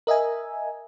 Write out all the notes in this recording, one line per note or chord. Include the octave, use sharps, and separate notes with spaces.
A#4 D#5 E5 G#5